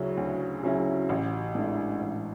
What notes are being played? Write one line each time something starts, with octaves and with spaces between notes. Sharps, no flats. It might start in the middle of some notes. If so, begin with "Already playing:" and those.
Already playing: D2 C#3 F#3 C#4 E4
D2
C#3 F#3 C#4 E4
A1
G#2 E3 A3 D4
A1